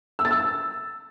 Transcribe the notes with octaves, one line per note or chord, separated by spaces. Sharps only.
E6
A6
E6